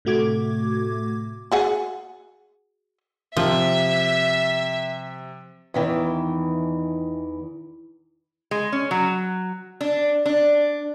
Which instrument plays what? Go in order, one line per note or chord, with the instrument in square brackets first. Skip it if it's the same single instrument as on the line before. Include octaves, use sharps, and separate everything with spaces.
[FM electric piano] A2 C3 A3 F#4 D6 G#6
[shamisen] F#4 G#4 F#5
[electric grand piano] C3 [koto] F3 [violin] E5
[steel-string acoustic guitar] E2 D#3 E3
[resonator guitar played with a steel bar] G#3
C#4
F#3
D4
D4